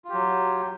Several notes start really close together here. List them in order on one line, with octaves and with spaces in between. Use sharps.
F4 G4 F#3